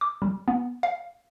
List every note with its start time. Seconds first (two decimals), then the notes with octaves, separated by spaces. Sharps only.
0.01 D6
0.22 G3
0.48 B3
0.83 F5